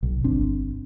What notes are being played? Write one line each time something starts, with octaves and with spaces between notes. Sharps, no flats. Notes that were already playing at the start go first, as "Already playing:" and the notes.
B1
G1 C4 D4